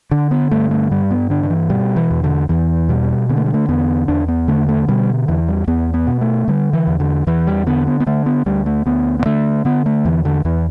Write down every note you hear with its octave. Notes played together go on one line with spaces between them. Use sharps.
D3 D4
B3
G2 A3
A3
G2 G3
B3
D3 D4
D3
E3
B2 G3
E3
E2
D3
E2 E3
B2 G3
D3 B3
A3
G3
A3
E2 B3
E2 D4
B3
D3 A3
A3
B2 G3
E2 E3
G3
E2 B3
B3
B2
A3
D3 G3
E3
E2
D3
E2 E3
G3
D3 B3
B3
B3
D3 A3
B3
D2 G3
A3
D2 B3
B3
D3 A3
D3 B3
A3
E2 E3
D3
E2 E3